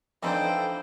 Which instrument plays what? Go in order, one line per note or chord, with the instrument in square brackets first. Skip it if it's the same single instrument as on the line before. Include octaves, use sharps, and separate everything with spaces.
[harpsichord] F2 C4 D4 [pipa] E3 D#4 A4 [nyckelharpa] C5 G5